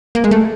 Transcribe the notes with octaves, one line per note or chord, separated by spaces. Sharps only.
A#3
G#3
A3